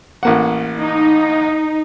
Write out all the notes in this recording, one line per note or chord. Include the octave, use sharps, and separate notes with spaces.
A1 A#3 F#5
D#4